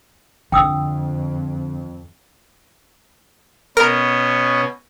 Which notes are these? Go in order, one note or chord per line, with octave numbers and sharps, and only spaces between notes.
F2 D3 G5 D#6 E6
B2 B3 C#4 A#4